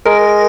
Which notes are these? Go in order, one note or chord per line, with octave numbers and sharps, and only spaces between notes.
G#3 A#4